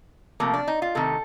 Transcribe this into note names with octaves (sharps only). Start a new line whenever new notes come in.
C3 F3 A3 A#3
D4
D#4
F4
C3 D#3 A3 A4